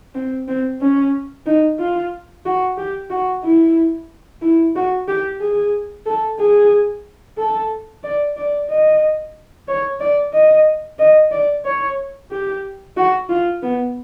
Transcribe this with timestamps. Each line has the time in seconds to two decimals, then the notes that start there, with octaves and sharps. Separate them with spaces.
0.14 C4
0.48 C4
0.81 C#4
1.46 D#4
1.79 F4
2.46 F#4
2.77 G4
3.10 F#4
3.43 E4
4.42 E4
4.76 F#4
5.08 G4
5.41 G#4
6.06 A4
6.39 G#4
7.38 A4
8.03 D5
8.37 D5
8.70 D#5
9.68 C#5
10.00 D5
10.33 D#5
10.99 D#5
11.31 D5
11.65 C#5
12.31 G4
12.97 F#4
13.29 F4
13.63 B3